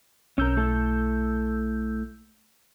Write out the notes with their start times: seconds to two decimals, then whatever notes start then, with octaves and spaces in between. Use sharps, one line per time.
0.38 B1 C#4 A#4 E6 G6
0.57 A3 E4 A4